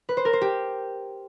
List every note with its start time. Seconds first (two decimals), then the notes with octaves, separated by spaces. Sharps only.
0.09 B4
0.17 C5
0.25 A#4
0.33 C5
0.41 G4